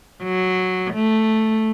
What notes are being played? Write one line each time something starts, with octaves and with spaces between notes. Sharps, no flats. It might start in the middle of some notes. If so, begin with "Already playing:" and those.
F#3
A3